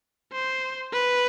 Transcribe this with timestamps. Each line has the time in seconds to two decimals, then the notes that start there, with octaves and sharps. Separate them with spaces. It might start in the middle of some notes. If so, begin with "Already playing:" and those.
0.33 C5
0.93 B4